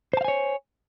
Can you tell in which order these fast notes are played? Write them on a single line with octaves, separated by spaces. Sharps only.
C5 A5 F5 G#5 C#5